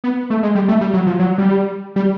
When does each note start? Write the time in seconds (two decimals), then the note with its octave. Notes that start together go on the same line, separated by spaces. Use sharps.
0.04 B3
0.30 A3
0.43 G#3
0.55 G3
0.68 A3
0.81 G3
0.93 F#3
1.07 F3
1.19 F#3
1.38 G3
1.96 G3